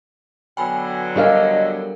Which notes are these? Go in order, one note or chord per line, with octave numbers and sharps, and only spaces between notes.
B2 D3 F#3 G5 G#5 B5
G3 D4 A4 A#4 D#5 F5